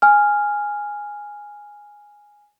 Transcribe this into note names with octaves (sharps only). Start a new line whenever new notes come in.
G#5 F6